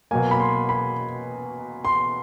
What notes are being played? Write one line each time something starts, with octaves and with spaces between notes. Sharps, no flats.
B2 F#3 A#3 G#5
B5
C6
B5
C6